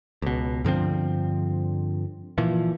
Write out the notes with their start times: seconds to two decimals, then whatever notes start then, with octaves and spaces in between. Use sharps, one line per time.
0.22 C#2 B2
0.65 G2 D3 F3 C4
2.38 A#2 E3 F3